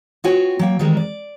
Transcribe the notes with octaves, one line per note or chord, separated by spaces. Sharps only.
B3 F4 F#4 C#5 G5 G#5
F#3 A#3 G5
D#3 E3 G3 G#3 C4 A#4
D5